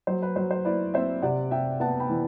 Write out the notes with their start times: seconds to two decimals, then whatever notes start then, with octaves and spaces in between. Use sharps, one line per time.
0.07 F#3 C5
0.22 B4
0.36 F#3 C5
0.51 C5
0.65 E4 B4 D5
0.94 C4 C5 E5
1.22 C3 D5 F#5
1.51 C3 E5 G5
1.80 B3 F#5 A5
2.00 G5 B5
2.09 E3